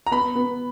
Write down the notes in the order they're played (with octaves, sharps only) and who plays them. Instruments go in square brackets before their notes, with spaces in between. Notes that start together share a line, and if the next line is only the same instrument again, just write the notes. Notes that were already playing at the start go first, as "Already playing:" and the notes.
[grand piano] A#5
[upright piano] B3 [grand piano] B5
[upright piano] B3